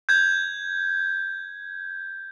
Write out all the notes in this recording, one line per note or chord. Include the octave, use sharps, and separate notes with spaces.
G6 G#6